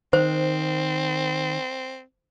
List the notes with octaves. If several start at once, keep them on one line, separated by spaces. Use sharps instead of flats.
D#3 C4 C5